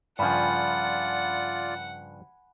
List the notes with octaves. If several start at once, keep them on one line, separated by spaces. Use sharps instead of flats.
G2 C#3 F3 F4 D5 F#5 G#5 B5